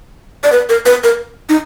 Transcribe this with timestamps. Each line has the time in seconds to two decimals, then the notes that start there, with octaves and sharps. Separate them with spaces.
0.44 D5
0.52 B4
0.69 A#4
0.86 B4
1.04 A#4
1.49 D#4